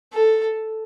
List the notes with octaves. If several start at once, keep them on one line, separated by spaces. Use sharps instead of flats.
A4